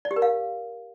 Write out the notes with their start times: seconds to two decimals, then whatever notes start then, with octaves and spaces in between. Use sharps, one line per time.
0.05 D5
0.11 G4
0.16 A#4
0.22 F5